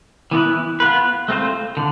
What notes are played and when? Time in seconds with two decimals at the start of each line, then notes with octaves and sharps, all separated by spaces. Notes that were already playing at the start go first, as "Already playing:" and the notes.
0.31 E3 B3 E4 B4
0.80 B3 F4 B4
1.28 A3 C4 F4 C5
1.77 D3